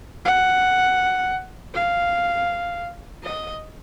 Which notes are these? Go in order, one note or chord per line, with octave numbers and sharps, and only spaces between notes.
F#5
F5
D#5